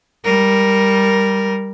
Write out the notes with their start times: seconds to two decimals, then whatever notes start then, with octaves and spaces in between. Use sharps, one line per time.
0.24 G3 A#4